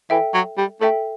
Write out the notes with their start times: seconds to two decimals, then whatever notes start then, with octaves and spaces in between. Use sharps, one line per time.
0.10 E3 A4 E5 G5
0.34 F#3
0.58 G3
0.81 A3 A4 E5 G5